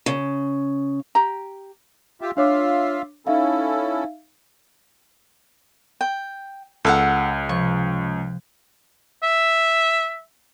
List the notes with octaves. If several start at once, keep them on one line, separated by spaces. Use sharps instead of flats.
C#3
G4 A#5
F4 G4 E5
D4 F4 C#5 E5 F5 D6
C#4 D#4 E4 A4 E5 F5
G5
C#2 A4 F5 F#5
C3 F3 C#6
E5